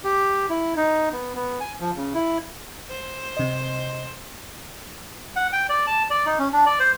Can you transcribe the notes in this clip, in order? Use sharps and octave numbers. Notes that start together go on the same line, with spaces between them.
G4
E4
D#4
B3
B3
G#5
F3
C#3
E4
C5
C3 D#5
F#5
G5
D5
A5
D5
D#4
C#4
D4
D5
C5